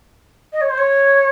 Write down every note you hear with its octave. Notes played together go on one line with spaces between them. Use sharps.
D#5
C#5
C5
C#5